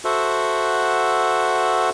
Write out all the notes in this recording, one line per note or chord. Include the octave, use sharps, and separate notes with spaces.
F#4 A4 C5 E5 F#5